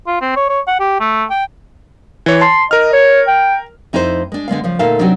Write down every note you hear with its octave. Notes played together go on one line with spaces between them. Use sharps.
F4
C4
C#5
C#5
F#5
G4
A3
G5
E3 C#5
A5 C6
A#4 D#5 F6
C#5
G5
F2 D#4 E4 A4 C5
G#3 D4
D3 G#3 B3 F5
C#3 F3
D2 A#2 D#4 A4 E5 F5
C3 F#3 C4 D4 D#4 G4